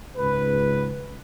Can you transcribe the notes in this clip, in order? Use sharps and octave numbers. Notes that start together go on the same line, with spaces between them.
C#2 G#2 B4